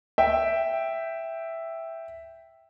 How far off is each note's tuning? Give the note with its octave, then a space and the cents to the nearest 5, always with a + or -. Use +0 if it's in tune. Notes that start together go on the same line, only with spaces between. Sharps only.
E5 +0 G5 +0